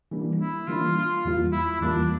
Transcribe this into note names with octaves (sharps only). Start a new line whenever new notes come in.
E3 G3 A#3 D4
E4
E3 G3 A#3 D4 F4
F4
E2 E3 G3 A#3 F4
E4
E2 E3 G3 A#3 D4 F4